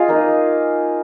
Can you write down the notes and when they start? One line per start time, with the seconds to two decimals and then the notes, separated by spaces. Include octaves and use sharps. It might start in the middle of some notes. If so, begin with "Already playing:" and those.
Already playing: F4 G#4 D#5 F5 G#5
0.09 A#3 D#4